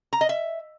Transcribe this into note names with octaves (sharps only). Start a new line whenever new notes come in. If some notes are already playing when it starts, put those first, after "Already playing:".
A#5
D#5
E5